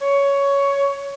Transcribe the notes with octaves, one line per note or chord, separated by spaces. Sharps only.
C#5